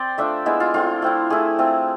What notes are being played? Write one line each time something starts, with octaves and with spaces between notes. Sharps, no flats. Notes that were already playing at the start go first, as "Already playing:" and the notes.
Already playing: C4 C5 D5
A3 D4 F4 E5
G#3 B3 E4 E5
F4
A3 C4 E4 F4
A3 C4 E4
A3 E4 G#4
A3 C4 F4